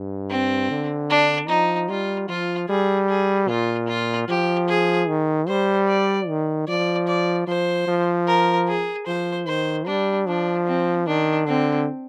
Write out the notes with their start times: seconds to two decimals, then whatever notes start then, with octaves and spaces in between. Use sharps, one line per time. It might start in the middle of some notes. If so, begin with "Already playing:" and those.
Already playing: G2
0.30 C4
0.70 D3
1.10 D4
1.49 F3 D#4
1.89 G3 F4
2.29 F3 F4
2.69 G3 G#4
3.09 G#4
3.48 A#2 F4
3.88 F4
4.28 F3 G4
4.68 G#4
5.08 D#3
5.48 G3 C5
5.88 D5
6.28 D#3
6.68 F3 D5
7.08 D5
7.47 F3 C5
7.88 F3
8.28 A#4
8.68 G#4
9.07 F3 C5
9.47 D#3 C5
9.87 G3 D4
10.27 F3 D4
10.67 C4
11.06 D#3 D4
11.47 D3 C4